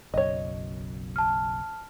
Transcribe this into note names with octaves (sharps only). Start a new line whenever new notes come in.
F#1 B1 F#2 C#5 D#5
A5 F6